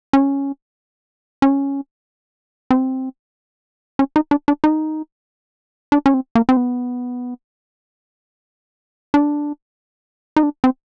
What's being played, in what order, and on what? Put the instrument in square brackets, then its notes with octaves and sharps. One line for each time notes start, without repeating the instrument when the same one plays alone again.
[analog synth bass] C#4
C#4
C4
C#4
D#4
D4
D4
D#4
D4
C#4
C4
A#3
C4
B3
D4
D#4
D4
C4